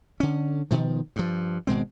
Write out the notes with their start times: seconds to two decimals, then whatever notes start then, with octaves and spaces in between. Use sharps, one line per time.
0.20 D3 C#4
0.71 B2 D#3 F3
1.16 G2 F3
1.67 G#1 B2 G#3 C4